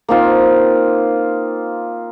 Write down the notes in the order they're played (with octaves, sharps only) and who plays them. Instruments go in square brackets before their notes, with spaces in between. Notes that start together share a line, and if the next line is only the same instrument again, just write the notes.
[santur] A#3 C4 D#4 F4